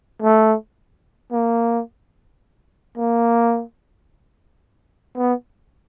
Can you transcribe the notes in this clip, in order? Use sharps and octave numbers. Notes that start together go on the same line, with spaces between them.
A3
A#3
A#3
B3